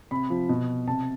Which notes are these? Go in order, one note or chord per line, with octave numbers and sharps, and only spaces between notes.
C3 B5
F3
B2
C3 A5